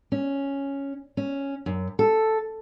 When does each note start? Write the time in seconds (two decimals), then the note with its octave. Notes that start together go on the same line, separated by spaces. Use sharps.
0.12 C#4
1.17 C#4
1.66 F#2
1.99 A4